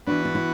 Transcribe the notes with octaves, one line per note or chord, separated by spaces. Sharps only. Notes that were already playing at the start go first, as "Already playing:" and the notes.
E3 B3 D4 F#4 B4
D4
E4